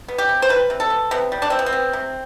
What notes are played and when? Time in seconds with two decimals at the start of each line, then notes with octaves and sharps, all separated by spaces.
0.08 B3
0.18 G4
0.29 C3
0.42 C5
0.49 G3 B4
0.70 C3
0.80 A4
0.90 B3
1.11 C3 B3
1.32 G3
1.42 D4
1.50 C3 C4
1.59 B3
1.66 C4
1.73 B3
1.93 C3